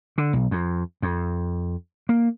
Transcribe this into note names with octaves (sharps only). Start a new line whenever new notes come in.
D3
B1
F2
F2
A#3